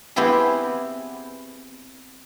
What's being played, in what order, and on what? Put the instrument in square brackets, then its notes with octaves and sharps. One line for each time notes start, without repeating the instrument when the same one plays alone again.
[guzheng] B3 C4 E4 G4 G#4